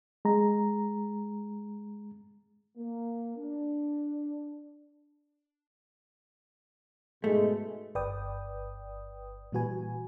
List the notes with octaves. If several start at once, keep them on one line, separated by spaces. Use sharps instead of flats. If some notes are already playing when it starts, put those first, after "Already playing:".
G#3 A#5
A#3
D4
G#2 B2 G#3 A3
G1 B4 D5 G5 D#6
A#2 E3 G3 F#4 B4 G#5